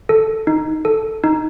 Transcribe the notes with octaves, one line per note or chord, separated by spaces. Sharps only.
A4
D#4
A4
D#4